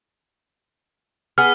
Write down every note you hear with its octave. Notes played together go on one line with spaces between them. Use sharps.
B3 G#4 F6